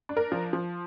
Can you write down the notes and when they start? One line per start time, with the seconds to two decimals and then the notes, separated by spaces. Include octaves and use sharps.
0.09 D4
0.17 A#4
0.32 F3
0.53 F3